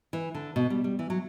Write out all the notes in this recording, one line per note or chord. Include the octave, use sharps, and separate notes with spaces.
E3
D3
B2
G3
G3
E3
F#3